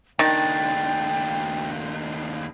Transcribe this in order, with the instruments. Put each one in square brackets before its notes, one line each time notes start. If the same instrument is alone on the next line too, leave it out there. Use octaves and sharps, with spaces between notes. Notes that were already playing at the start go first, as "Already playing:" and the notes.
[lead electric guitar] D#2 D4 [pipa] D#3 [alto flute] G5 [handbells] A6